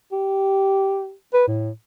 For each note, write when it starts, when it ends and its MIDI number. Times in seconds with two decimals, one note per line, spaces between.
0.12 1.13 67
1.34 1.48 71
1.48 1.70 45